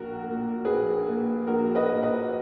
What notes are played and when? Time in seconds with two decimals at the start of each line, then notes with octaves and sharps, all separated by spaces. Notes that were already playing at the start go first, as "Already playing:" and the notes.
Already playing: A#1 F#4 A#4
0.23 A#3
0.29 A#2
0.65 A#1 G#4 B4
1.07 A#2 A#3
1.47 A#1 F#4 A#4
1.75 B4 D#5
1.88 A#2 A#3
2.03 B4 D#5